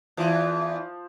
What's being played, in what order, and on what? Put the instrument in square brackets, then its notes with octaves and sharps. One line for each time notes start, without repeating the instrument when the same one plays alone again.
[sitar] E2 E3 [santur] F3